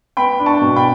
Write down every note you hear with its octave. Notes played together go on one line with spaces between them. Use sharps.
B3 G5 B5
D4
A5 C#6
B2
G5 B5